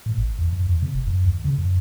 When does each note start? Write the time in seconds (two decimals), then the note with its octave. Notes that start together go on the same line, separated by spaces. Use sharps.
0.06 A2
0.18 A1
0.39 E2
0.53 F#2
0.67 E2
0.82 C3
0.94 E1
1.07 F#2
1.25 D#2
1.44 C#3
1.58 F#2